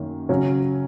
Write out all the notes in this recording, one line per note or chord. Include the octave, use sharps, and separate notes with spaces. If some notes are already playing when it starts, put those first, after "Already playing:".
Already playing: F#2 D#3 A#3
C#3 F#3 C#4